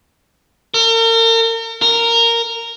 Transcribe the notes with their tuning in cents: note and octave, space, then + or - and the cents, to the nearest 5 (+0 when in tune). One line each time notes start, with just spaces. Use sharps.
A#4 -40
A#4 -10